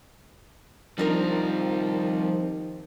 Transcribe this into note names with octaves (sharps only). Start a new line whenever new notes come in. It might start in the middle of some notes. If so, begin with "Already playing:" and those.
D#3 F3 G3 C4 D4 D#4 A#4